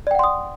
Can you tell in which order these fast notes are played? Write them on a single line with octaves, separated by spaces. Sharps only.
D5 G5 F#5 C6 D#6